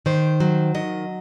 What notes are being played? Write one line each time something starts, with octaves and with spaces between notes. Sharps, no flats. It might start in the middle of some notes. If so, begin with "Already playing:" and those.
D#3 C5
F#3
D#3 D#5